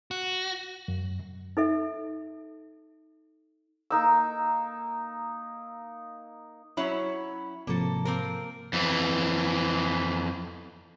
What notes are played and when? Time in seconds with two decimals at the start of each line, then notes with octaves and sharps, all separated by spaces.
0.11 F#4
0.88 F#2
1.57 D#4 A4 E5
3.90 A#3 D#4 E6
6.77 F#3 C#4 E4 B5
7.67 G#2 C3 F3 A#3 A4
8.05 A#3 C4 A#4
8.73 F2 E3